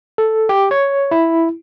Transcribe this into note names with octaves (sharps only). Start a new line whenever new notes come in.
A4
G4
C#5
E4